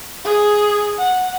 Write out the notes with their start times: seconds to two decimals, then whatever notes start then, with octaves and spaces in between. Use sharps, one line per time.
0.25 G#4
0.98 F#5